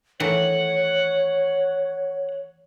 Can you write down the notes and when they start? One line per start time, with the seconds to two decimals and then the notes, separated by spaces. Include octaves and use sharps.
0.20 D#3 E3 A3 C#5 F#5